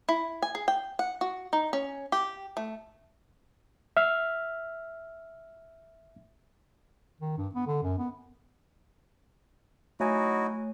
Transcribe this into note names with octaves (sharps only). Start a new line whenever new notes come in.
E4
G#5
G#4
G5
F#5
F#4
D#4
C#4
G4
A3
E5 F6
D#3
G2
B3
D3
F#2
B3
F#3 A3 D#4 E4 F#4 C#5 G#5